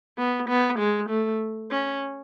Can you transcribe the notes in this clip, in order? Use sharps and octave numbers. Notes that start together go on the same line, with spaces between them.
B3
B3
G#3
A3
C#4